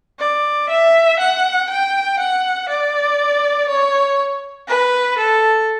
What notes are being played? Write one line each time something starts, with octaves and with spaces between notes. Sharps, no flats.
D5
E5
F#5
G5
F#5
D5
C#5
B4
A4